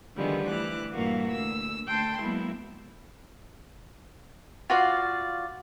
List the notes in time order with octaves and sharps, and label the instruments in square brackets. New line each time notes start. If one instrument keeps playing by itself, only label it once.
[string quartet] D3 D#3 F3 G3 G#3 B3
D2 E3 D6 F#6
G2 A#2 E3 A#3 F#4 F5
D2 E6
D2 G5 A5 C6
F#3 G#3 A#3 B3 E4
[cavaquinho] F4 F#4 D5 F5